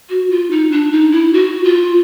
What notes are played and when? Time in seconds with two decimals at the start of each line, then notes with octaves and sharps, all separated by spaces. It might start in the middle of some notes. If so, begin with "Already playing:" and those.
0.10 F#4
0.30 F4
0.51 D#4
0.72 D4
0.92 D#4
1.12 E4
1.33 F#4
1.64 F4